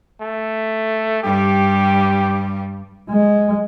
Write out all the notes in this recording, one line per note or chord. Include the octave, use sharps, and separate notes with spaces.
A3
G2 G3 G4
G#3